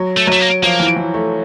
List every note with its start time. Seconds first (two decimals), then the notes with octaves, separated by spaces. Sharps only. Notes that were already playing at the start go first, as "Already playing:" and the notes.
Already playing: F#3
0.17 A3
0.27 F#3 A3
0.40 A#3
0.63 F3 A#3
0.80 E3
0.96 E3
1.14 A3